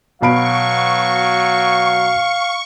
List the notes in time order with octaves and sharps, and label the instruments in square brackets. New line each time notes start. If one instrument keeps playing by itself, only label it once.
[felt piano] B2 B5 D7 [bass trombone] F#3 [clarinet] F5 [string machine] C#6